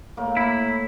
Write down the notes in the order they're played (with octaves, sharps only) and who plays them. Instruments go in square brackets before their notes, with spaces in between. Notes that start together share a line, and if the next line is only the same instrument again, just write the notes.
[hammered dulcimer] A2 A#3
[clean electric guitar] E4